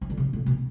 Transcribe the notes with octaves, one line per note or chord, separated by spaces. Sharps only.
E3
D3
C3
B2
A2
B2